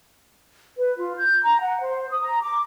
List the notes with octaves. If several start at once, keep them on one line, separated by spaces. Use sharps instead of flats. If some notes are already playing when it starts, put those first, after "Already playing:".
B4
F4
G6
A#5
F#5
C5
D#6
A#5
D6